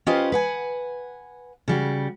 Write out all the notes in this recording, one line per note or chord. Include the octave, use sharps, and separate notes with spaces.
C#4 F4 G4 B4 C5 D#5
B4 F#5 G#5
C#3 G3 F#4